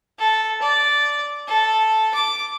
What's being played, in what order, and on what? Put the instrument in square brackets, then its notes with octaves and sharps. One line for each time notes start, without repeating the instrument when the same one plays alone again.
[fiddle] A4
D5
A4
D6